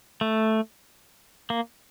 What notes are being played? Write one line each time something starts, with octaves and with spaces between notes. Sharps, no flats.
A3
A#3